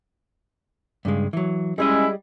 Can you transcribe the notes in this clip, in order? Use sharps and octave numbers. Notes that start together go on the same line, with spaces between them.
G2 C#3 G#3
E3 F#3
G3 G#3 C#4 E4 G#4 D#5